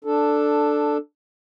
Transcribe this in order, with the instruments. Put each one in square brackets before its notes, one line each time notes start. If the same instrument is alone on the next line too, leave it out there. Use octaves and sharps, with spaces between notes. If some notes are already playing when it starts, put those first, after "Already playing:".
[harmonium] D4 A4